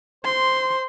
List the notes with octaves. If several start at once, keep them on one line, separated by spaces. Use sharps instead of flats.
C5 C6